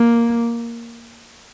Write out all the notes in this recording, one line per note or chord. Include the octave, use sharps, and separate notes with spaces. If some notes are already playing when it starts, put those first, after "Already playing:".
Already playing: A#3